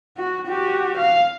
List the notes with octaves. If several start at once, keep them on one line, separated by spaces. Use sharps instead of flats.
F#4
F#4 G4
F5